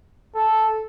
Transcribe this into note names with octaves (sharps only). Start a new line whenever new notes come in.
A4